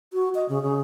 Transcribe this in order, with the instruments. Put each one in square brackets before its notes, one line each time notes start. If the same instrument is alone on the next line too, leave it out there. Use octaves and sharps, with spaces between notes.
[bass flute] F#4
D#5
C#3
C#3